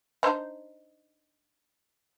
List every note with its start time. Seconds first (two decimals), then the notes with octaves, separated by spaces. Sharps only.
0.23 D4 D#4 C5